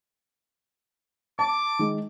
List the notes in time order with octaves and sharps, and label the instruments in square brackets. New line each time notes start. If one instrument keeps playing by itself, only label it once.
[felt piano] A5 [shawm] D6
[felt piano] D#3 G#3